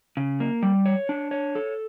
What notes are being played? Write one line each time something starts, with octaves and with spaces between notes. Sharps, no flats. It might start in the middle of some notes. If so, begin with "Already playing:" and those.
C#3
A#3
G3
C#5
D4
C#5
A4